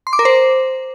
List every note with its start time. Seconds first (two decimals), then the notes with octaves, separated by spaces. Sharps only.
0.07 C6
0.13 D6
0.19 A#4
0.25 C5